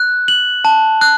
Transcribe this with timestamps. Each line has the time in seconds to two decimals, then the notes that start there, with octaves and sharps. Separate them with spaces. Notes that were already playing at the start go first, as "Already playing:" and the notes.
Already playing: F#6
0.28 F#7
0.65 A5
1.01 F#6